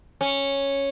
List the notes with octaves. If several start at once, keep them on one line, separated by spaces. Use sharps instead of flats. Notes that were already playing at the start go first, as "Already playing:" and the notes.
C#4